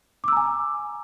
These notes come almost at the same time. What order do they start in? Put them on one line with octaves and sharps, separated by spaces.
D6 E6 A#5 G#5